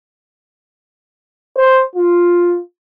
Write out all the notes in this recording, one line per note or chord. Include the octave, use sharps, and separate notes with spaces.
C5
F4